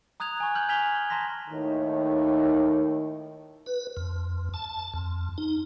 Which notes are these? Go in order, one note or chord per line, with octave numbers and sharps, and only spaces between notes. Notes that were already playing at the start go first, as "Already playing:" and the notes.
A#5 D#6 F#6 G#6 F7
G#5 C#6
F6 G6 F#7
G#5 F6 G#6 B6 F7 G7
A5 A#5 C6 A#6 B6
D#2 A2 D#3
B4
F2
A5
F2
D#4